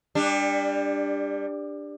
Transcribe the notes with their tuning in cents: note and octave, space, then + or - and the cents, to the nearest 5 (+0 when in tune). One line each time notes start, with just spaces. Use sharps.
G3 +25 D4 +0